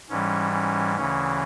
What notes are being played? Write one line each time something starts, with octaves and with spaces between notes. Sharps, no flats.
G#2 E3 G3 C#4
C#4
D2 C#3 E3 C#4